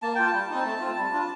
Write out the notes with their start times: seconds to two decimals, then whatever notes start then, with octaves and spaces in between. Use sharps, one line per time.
0.02 A#3 A5
0.15 F4 G5
0.27 A5
0.33 G3
0.49 C4 D#4
0.65 A3
0.81 C4 F4
0.97 G3
1.12 D4 F4